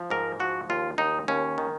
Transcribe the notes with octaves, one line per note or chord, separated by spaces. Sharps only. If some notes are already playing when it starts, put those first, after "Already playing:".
Already playing: F3
G#2 A#4
F3 F#4
D#2 F4
D#2 D#4
D#2 C#4
D#3